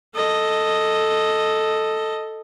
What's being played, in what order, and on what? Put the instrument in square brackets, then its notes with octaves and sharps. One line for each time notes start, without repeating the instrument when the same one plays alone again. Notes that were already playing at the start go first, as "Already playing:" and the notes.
[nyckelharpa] A4 D#5